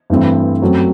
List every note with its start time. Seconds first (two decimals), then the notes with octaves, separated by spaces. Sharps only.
0.10 G2 E3 A3 C4
0.62 F#2 F#3 A3 C4